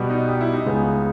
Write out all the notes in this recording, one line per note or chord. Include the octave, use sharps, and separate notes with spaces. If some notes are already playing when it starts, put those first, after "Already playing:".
Already playing: B2 G3 B3
D#4
G4
E4
D#4
C#2 C#3 G#3 B3